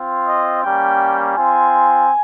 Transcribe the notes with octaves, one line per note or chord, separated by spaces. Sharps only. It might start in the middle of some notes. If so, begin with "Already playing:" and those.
Already playing: C4 F4
D#5
G3 A#3 C#4 G5
C4 F4 G#5